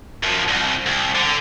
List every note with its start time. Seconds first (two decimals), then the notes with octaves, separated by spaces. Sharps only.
0.23 F#2 F3
0.48 C2
0.86 C2
1.15 D3